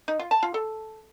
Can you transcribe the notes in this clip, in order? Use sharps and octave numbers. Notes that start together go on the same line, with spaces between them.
D#4
F4
A5
F4
A4